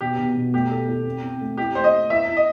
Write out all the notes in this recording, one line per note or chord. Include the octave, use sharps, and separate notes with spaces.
B2 G4
B2
B2
A3 G4
A4
A4
C4
C4
A3
E4 G4
A3 C5
D#5
A3
E4 E5
E4
D#5